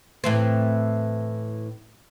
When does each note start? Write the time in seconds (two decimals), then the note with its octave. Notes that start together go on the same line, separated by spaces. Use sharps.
0.24 A2 E3 C4